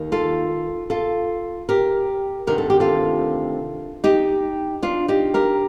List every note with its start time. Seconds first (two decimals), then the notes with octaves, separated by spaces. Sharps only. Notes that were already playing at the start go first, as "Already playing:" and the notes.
Already playing: D#2 D#3
0.12 F4 A4
0.90 F4 A4
1.69 G4 A#4
2.47 D2 C3 D#3 A#4
2.58 A4
2.70 G4
2.80 F4 A4
4.04 D#4 G4
4.83 D4 F4
5.08 D#4 G4
5.34 G4 A#4